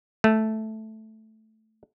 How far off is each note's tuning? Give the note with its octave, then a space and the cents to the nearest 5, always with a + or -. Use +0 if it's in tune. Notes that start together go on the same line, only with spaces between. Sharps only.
A3 -5